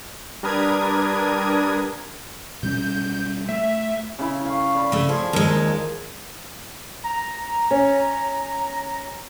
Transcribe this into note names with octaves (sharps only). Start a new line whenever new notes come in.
G3 D4 A#4 B4 D#6 G#6
B2 G3 C#4 G6
A3 E5
C#3 E4
F5 C#6
D5 B5
C#3 A3
F3 G#4
D#2 G#3 A#4
A#5
C#4